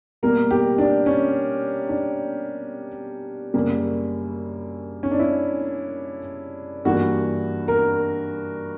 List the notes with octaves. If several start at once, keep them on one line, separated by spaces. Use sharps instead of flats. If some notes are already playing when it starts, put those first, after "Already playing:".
B2 G3 A#3 A#4
G4
D4
C#4
D4
F#2 C#3 G3 A#3
C#4
D4
E4
G2 E3 G3 A#3 F#4
A#4